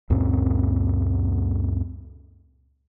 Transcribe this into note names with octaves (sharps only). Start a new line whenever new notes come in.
C#2 F#2 A#2 C4